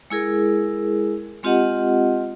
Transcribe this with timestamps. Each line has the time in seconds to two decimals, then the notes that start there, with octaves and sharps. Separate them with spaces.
0.10 G#3 E4 G#4 A#4
1.43 G#3 C4 F4 G4 D#5 F#5